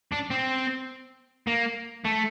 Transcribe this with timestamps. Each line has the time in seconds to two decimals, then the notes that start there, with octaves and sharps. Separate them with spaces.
0.12 D4
0.30 C4
1.47 A#3
2.05 A3